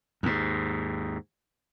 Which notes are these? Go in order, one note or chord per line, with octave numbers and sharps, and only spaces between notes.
D#2 G#2